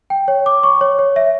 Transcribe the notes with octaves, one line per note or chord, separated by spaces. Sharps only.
G5
C#5
D6
C#6
C#5
C#5
E5